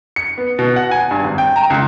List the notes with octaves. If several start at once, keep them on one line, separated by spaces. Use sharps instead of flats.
C#7
B3
B2
F#5
G#5
G2
G#1
G5
A#5
C#2